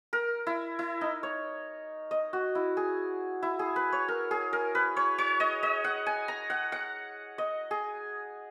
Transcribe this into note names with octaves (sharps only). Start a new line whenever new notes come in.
A#4
E4
E4
D#4
C#5
D#5
F#4
E4
G#4
E4
G#4
B4
C#5
A#4
G#4
A#4
B4
C#5
C#5
D#5
D#5
F#5
G#5
A#5
F#5
F#5
D#5
G#4